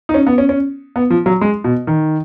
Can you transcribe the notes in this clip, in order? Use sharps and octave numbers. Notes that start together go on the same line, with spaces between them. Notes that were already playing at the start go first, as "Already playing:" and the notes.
D#4
C#4
B3
C#4
C#4
B3
F3
F#3
G#3
B2
D#3